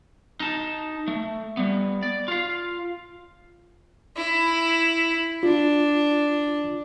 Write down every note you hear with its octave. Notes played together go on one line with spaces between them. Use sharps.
D#4 A5
A3
G3 B3
D5
F4 F5
E4
D4 F4